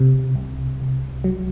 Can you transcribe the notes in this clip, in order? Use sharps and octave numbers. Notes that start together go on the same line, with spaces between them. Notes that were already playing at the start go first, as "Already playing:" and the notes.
Already playing: C3
C2
C2
F#3